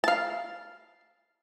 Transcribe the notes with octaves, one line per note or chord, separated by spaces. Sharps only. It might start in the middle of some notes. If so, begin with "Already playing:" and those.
F5 A5